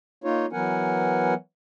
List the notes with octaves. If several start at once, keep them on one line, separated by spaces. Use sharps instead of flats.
A#3 D#4 F4 C#5
E3 F#3 B3 A#4 F#5 G#5